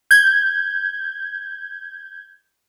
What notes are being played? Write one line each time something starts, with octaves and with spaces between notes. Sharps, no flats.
G6 G#6